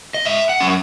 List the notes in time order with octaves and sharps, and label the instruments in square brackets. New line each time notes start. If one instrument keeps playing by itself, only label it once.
[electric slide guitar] D#5
G#2 E5
F#5
F#3 C#4